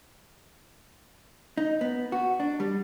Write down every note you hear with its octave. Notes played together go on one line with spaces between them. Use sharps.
D#4
B3
F#4
D4
G3